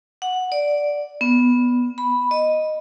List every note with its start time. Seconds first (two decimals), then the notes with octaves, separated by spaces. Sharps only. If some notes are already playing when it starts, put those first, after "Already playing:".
0.22 F#5
0.52 D5
1.21 B3
1.98 B5
2.31 D#5